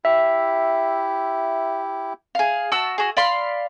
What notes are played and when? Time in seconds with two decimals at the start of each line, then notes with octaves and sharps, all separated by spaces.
0.05 E4 G4 E5
2.35 G#4 F5
2.72 F#4 A5 E6
2.98 F#4 G#4
3.17 D5 F5 B5 C6